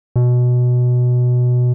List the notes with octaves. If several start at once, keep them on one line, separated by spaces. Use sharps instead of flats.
B2